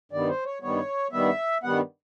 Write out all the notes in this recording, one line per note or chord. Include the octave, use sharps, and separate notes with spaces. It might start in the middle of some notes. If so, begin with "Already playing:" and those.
G2 D#3 G3 B3 D5
C5
C#5
G2 D#3 G3 B3 C#5
G2 D#3 G3 B3 E5
G2 D#3 G3 B3 F#5